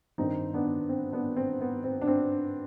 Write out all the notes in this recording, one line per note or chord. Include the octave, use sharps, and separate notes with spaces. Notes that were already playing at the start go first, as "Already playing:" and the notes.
G2 D#3 C4 D#4
B3 D4
C4
B3 D4
C4
B3
C4
D4
C4